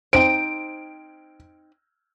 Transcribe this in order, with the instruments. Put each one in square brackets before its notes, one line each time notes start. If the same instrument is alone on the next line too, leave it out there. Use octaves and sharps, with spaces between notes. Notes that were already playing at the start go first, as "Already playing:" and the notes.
[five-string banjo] C4 D#4 C5 [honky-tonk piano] D7